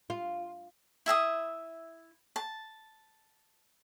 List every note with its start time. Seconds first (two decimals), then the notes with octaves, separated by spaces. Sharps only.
0.10 F4
1.06 E4 E5 G#5 D#6
2.36 A5